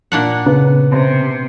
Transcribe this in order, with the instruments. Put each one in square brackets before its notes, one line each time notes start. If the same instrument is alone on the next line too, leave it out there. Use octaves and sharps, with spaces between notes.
[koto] A#2 D4 F#5
[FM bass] C#3 [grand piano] B3
[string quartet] C3